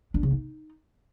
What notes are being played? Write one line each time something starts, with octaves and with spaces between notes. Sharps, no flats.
D4
C#3
D#4